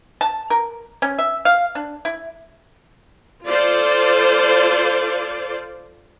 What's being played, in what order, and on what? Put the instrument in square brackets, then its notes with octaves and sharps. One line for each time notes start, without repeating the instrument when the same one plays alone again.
[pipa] A5
A#4
C#4
E5
F5
D4
E4
[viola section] F4 A4 C5 D5